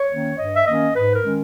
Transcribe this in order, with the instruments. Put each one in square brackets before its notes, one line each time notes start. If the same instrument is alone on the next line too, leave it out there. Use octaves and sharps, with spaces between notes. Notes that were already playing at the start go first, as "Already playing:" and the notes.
Already playing: [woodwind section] C#5
D#3 A#3 C#4
G2 D#5
E5
D#3 A#3 C#4 D#5
G#2 B4
A#4
D#3 G#3 C#4